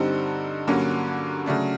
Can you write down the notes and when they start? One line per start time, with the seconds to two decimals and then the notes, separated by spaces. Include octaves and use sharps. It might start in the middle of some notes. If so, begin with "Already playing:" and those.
Already playing: G2 D3 G3 C4 D#4
0.67 G2 D3 F#3 A#3 C#4
1.46 C#3 F#3 A3 D4